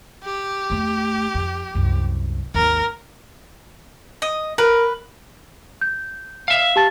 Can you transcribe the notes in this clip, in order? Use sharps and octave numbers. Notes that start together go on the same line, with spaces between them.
G4
E2 A3
F2
C2 F#2
G#1 D#2 A#4
D#5
A#4 B4
G6
E5 F5
G4 A5 A6